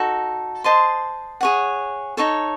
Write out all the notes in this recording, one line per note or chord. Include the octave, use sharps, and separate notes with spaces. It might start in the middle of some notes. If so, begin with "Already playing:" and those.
Already playing: D#4 F#4 A4
C5 D#5 A5 C6
G#4 C#5 F#5
D#4 A4 C#5